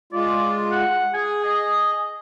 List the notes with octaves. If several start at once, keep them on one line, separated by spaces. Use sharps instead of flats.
G#3 F4 D5
F#5
G#4 G#5
D#5